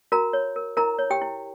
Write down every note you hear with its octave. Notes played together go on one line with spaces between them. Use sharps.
F#4 A#4 A#5
C#5
A#4
E4 A#4 A#5
C#5
G4 G5
E4